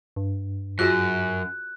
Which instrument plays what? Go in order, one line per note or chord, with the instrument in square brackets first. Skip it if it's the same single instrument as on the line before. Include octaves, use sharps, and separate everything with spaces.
[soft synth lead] G2
[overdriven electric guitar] F#2 [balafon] F4 F#4 G#4 [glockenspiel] F#6